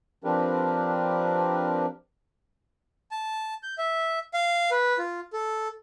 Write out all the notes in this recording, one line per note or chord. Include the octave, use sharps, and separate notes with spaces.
F3 C4 D4 G4 A#4 B4
A5
G6
E5
F5
B4
F4
A4